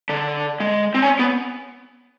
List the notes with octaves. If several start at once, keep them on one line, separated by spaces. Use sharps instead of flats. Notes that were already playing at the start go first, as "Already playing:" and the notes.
D3
G#3
C4
C#4
B3